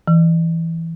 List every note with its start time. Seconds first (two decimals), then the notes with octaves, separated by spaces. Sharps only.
0.08 E3